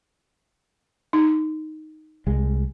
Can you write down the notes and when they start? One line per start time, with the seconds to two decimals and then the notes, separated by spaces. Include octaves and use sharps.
1.13 D#4
2.27 C2 G#3